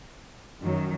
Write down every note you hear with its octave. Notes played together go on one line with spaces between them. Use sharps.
F#2 D#3 F#3